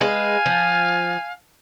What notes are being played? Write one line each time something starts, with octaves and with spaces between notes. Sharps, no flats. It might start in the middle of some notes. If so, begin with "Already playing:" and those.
G#3 B4 F5 G#5
F3